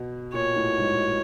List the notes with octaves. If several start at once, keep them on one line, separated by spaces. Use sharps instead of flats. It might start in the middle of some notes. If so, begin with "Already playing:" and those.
Already playing: B2
A#2 C#5
A2
G#2